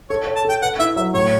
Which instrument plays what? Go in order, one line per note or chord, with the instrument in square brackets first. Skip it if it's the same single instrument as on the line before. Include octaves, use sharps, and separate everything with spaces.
[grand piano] A4 [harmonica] C#5
[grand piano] C#5
[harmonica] A5
[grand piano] A4 [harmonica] G5
[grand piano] B4 [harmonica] F#5
[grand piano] E4 [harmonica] E5
[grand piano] F#3 [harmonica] E5
[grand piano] A2 [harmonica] C#5